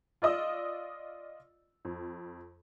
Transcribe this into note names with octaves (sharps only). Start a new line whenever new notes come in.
F4 D5 D#5 D#6 E6
F2